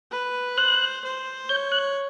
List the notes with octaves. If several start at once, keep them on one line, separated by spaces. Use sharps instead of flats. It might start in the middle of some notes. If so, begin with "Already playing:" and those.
B4
C5 F#6
C5
C#5 G6
F#6